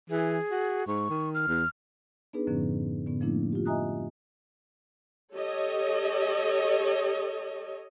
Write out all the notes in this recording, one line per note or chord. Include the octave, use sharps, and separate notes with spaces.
E3 G#4
F#4
G#2 C#6
D#3
F6
E2
B3 D4 D#4 G#4 B4
F#2 A2 D3 F3 B3 C#4
A2 D3 B3
F3 A3 A#3 C#4 D4 E4
F4 G4
D#5 E5 G#5 A#5 D#6 F#6
G4 A4 C#5 D#5